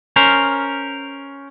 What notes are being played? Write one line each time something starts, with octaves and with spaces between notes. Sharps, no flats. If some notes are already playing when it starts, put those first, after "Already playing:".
C#4 A#4 C5